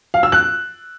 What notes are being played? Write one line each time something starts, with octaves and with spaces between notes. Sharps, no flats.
F5
E6
F#6